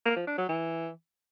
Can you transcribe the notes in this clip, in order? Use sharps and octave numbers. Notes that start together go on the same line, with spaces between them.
A#3
F3
D4
F#3
E3